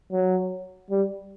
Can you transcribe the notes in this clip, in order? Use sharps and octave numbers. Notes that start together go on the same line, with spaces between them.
F#3
G3